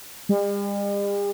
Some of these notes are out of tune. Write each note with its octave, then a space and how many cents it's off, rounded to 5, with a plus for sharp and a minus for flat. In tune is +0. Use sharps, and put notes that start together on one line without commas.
G3 +45